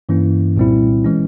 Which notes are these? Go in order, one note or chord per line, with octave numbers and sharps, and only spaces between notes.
G2 E3 A#3 C#4 E4
C2 A#2 G3 C4 E4
E3 G#3 C#4